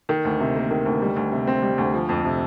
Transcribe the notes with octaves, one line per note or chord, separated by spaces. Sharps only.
D#3
D2
C3
A#3
D#3
D2
G3
D2
C3
C4
G3
D2
F3
F2
C3